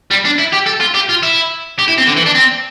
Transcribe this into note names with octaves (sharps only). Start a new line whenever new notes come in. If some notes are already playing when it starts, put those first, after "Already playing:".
G3
D4
E4
G4
A4
F4
G4
F4
E4
G4
E4
C4
D3
E3
D4
C4